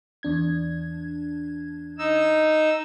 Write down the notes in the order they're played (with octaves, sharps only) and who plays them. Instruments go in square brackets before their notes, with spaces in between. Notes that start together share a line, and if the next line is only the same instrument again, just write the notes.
[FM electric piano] E2 D4 G#6
[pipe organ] D#4 E6